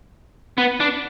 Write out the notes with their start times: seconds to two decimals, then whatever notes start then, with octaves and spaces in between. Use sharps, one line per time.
0.58 B3
0.80 D4